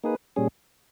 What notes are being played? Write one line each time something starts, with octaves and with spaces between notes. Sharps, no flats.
A#3 D#4 G#4 B4
A#2 G3 C#4 G#4